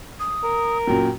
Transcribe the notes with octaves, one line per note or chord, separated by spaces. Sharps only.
D#6
A#4
F#2 A#2 F#3 G5